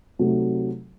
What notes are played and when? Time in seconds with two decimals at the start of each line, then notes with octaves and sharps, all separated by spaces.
0.19 C3 F#3 A3 D#4